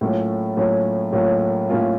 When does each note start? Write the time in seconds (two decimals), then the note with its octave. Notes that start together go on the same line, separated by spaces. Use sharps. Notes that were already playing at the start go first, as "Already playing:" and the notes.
0.01 A2 F#3 A#3 C#4 F4
0.57 A2 F#3 A#3 C#4 F4
1.12 A2 F#3 A#3 C#4 F4
1.69 A2 F#3 A#3 C#4 F4